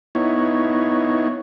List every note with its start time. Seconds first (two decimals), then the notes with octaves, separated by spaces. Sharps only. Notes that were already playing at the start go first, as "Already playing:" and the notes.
0.15 B3 D#4 E4 C#5